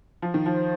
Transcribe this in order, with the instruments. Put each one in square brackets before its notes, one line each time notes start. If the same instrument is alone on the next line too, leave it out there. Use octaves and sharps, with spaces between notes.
[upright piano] F3
D#3
[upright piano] F3 [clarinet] C5